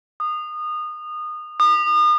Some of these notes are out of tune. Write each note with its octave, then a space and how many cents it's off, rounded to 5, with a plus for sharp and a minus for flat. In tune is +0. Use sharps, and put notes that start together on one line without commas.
D#6 -25
D#6 -40